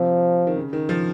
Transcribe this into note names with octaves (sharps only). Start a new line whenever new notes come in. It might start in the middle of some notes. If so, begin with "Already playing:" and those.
Already playing: C3 F3
D#3
C#3
D#3
F3